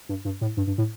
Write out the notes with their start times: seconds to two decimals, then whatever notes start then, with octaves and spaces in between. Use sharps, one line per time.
0.09 G2
0.25 G2
0.41 A2
0.57 G2
0.67 G2
0.78 A2